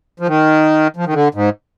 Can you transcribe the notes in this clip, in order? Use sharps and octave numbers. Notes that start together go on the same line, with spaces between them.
F3
D#3
F3
D#3
D3
G#2